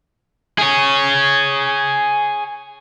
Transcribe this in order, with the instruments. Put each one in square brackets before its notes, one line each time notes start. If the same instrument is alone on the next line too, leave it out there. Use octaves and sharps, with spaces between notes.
[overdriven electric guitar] G#4 C#5